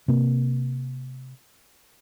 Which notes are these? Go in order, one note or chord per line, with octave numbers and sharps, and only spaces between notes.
C3 A#3